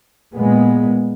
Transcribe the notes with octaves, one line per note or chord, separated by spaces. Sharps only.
A#2 G#3 B3